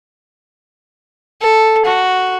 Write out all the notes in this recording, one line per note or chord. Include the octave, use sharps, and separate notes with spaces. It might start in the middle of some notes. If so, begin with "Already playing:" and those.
A4
F#4